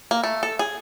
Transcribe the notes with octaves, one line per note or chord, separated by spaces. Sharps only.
A#3
A3
A4
G#4